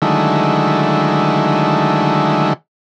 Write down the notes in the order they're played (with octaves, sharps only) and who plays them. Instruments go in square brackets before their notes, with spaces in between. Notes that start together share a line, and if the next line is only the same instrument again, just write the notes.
[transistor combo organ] D3 D#3 F#3 G#3 A3 E4